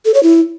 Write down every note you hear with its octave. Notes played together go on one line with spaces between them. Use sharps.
A4
C#5
E4